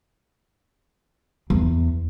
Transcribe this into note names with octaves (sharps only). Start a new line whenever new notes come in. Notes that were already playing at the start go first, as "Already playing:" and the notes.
E2